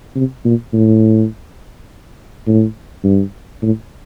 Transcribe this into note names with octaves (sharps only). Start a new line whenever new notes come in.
C3
A#2
A2
A2
G2
A2